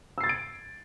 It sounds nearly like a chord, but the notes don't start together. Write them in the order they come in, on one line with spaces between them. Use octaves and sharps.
E6 C7 A6 G#6 D7